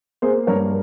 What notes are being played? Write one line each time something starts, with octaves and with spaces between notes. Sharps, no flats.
A#3 G#4 C5
G2 A#4 C#5